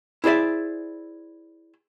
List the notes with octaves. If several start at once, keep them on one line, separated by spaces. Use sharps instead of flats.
E4 G#4 C5 D5 E5